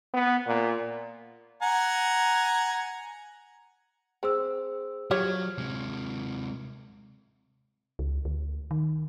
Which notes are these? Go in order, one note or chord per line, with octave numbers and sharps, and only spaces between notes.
B3
A#2
F#5 G#5 A#5
C4 G#4 C5 E6
F3 F#3 G4 C#5 F6 G#6
C3 G#3
C#2
D2
D#3